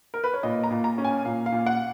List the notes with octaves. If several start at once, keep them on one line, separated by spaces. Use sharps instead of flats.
A#4
B4
C#5
A#2 D#5
A#5
A#2
A#5
C#4
G#5
A#2 F5
F5
A#2
F#5